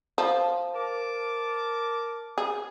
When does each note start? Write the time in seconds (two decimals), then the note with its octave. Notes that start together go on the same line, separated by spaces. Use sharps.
0.18 F3
0.75 A#4 A5 D6
2.38 G#4